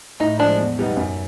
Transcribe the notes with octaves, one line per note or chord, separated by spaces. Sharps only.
A2 D#4
F3 G#3 D4
E2
B2 G3 B3 D#4
F#2